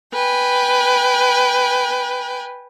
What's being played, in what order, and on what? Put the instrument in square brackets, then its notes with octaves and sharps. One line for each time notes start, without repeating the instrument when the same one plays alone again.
[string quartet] B4 G5 G#5